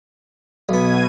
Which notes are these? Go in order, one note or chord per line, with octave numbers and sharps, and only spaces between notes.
B1 B2 B3 G#6 D#7